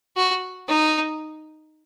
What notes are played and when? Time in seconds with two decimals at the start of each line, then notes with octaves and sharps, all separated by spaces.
0.16 F#4
0.68 D#4